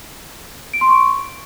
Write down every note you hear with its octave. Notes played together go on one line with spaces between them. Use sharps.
D7
C6
C#6